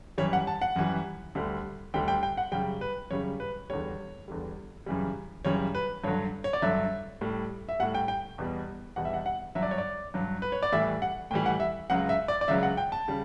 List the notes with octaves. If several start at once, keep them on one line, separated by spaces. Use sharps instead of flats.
F#2 E3 G3 C#5
F#5
A5
F#5
F#2 E3 G3
D2 D3 G3
D2 D3 G3 G5
G5
G5
F#5
F#2 C#3 G3 G5
B4
F#2 C#3 G3 C#5
B4
E2 D3 G3 C#5
E2 D3 G3
F#2 C#3 E3 G3
F#2 C#3 E3 G3 C#5
B4
G2 D3 F#3 C#5
C#5
D5
G2 D3 F#3 E5
A2 G3
E5
A2 G3 F#5
G5
G5
E2 B2 G3
E2 B2 G3 F#5
E5
F#5
F#5
G2 F#3 E5
D5
C#5
D5
G2 F#3
B4
C#5
D5
A2 E3 G3 E5
F#5
A2 E3 G3 G5
F#5
E5
C#2 C#3 F#3 F#5
E5
D5
D5
C#2 C#3 F#3 E5
F#5
G5
A5
C#3 G3